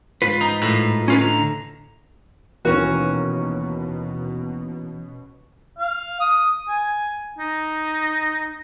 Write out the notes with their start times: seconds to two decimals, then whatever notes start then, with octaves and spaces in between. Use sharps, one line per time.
0.22 G#2 F4 B4
0.41 D#4
0.62 A2
1.08 C#4 F4 B4
1.21 D3 A#5
2.65 D#2 B2 E3 A#3 C#4 F#4 B4
5.78 F5
6.20 D#6
6.68 G#5
7.38 D#4